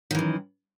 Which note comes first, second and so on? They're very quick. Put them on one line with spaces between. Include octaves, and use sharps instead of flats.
D#3 E3 F#2